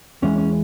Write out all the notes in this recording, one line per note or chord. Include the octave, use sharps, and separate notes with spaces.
E2 E3 G#3 C#4
C#4